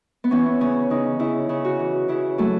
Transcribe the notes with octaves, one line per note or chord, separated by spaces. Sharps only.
B3
E3 C#4
C#3 C#4
C#3 D#4
C#3 E4
C#3
F#4
E3
C#3 E4
F#3 A3